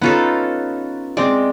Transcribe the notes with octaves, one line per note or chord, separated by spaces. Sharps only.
B3 C#4 D#4 F4 A4
G#3 C4 D5